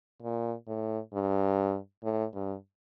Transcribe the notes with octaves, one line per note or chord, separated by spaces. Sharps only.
A#2
A2
G2
A2
G2